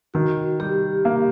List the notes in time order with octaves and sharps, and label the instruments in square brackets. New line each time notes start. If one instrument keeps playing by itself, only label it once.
[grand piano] D#3 [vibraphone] F#4
[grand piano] G3 [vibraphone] G4
[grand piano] A#3